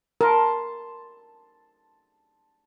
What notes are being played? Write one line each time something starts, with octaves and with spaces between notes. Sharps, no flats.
A#4 A5 C6